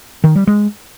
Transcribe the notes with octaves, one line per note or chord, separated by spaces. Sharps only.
D#3
G3
G#3